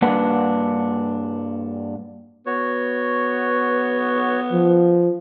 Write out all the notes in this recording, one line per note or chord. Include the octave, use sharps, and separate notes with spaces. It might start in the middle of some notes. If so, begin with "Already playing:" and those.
G2 A#3 D4 B4 F#5
B3 F#4 C#5
F3